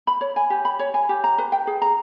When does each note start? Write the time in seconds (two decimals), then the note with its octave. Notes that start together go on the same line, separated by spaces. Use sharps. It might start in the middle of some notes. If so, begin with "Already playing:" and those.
0.07 B5
0.21 C#5
0.36 G#5
0.50 G4
0.65 B5
0.79 C#5
0.94 G#5
1.09 G4
1.24 A#5
1.38 B4
1.52 G5
1.67 G#4
1.82 A#5